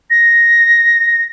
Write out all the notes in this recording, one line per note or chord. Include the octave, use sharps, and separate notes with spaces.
A#6